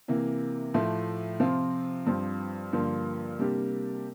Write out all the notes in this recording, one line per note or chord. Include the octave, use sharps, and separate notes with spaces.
C3 E3 A#3
A2 F3 A3
C3 F3 C4 F4
G2 F3 C4
G2 D3 F3 A#3
C3 G3 A#3 D4 G4